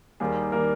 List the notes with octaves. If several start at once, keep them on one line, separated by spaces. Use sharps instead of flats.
D#2 D#3 G3 A#3 G#4
D#3 G3 A#3 A#4